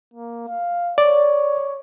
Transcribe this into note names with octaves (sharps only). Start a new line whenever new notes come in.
A#3
F5
C#5 D5